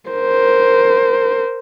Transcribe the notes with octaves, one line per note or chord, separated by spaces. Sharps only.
A#4 C5